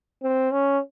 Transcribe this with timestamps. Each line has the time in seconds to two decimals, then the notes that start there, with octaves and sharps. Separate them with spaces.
0.23 C4
0.52 C#4